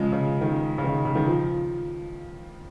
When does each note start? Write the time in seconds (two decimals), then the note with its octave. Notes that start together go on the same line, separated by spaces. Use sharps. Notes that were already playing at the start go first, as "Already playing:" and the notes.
Already playing: C#3 F3 G#3
0.12 C#3
0.41 D#3
0.78 C#3
0.84 D#3
1.05 C#3
1.15 D#3
1.26 F3